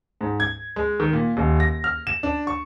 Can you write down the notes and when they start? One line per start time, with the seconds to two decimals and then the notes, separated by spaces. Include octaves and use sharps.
0.21 G#2
0.40 G#6
0.76 G#3
1.00 D#3
1.13 A#2
1.37 D#1
1.60 A#6
1.84 F6
2.07 E7
2.23 D4
2.47 C#6